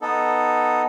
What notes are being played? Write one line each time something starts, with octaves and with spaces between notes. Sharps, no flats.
B3 D#4 A4